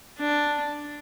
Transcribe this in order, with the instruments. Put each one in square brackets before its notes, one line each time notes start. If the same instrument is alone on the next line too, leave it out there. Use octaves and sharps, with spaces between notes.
[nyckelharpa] D4